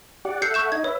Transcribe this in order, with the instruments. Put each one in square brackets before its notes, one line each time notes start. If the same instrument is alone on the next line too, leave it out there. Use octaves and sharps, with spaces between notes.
[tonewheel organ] G4 D5 F#5
[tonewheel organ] A4 E5 F#5 [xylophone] G6 C7 C#7
[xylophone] C#6 G6 E7
[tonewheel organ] D#4 D#5 [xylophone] G#6
[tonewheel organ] B4 E5 [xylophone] C#5